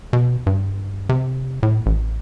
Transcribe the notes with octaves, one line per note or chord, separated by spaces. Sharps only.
B2
G2
C3
A2
A1